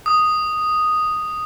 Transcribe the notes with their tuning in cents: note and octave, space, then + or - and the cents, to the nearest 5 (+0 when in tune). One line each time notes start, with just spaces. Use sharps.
D#6 -5